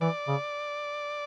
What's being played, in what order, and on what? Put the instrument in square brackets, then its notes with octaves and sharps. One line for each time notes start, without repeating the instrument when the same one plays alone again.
[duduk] E3 [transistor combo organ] D5
[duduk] C#3